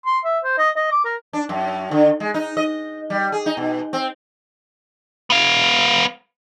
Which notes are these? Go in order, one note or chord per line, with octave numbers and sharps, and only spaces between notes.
C6
E5
C5
D#5
D#5
D6
A#4
D4
F#2
D3
G#3
D#4
D#5
G3
G#4
D#4
B2
C4
B3 F5